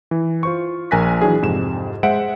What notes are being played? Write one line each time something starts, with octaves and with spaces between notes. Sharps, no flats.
E3
F4 C5 C#6
A#1 A#4 G#5 F#6 A#6 B6
E3 F#3 D4 G#4
F2 G#2 C3 E7
G#3 C5 E5 F#5 D7